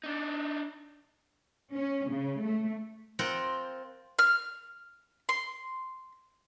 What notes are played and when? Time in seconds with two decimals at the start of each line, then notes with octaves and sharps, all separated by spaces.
0.04 D4 D#4
1.73 C#4
2.09 C#3
2.43 A3
3.19 C4 F4 A#4 F#5 G5
4.19 F6
5.29 C6